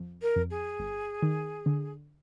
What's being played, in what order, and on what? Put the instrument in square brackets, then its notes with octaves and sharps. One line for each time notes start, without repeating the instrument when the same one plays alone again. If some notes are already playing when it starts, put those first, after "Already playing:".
Already playing: [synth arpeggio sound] F2
[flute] A#4
[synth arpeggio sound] F2
[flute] G#4
[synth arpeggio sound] G1
D#3
D3